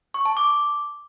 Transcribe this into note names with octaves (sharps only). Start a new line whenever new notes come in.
C#6
A5
D6